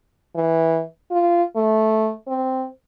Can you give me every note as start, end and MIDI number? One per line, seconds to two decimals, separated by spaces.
0.35 0.82 52
1.11 1.43 65
1.56 2.11 57
2.27 2.65 60